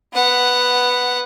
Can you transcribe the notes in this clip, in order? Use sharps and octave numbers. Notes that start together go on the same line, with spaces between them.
B3 F#5